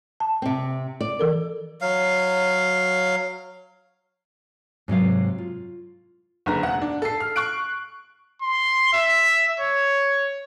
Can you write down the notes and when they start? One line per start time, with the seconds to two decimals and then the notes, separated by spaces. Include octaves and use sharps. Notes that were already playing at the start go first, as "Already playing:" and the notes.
0.20 A5
0.42 C3 C4
1.01 D5
1.19 E3 A4 A#4
1.81 F#3 F5
4.88 G#2 C3 F#3 F5
5.38 F4
6.46 F#1 D3 B4 A#5
6.62 E1 F#5
6.82 D4
7.02 A4 C7
7.20 F6
7.36 C#6 F#6 D7
8.42 C6
8.93 E5
9.60 C#5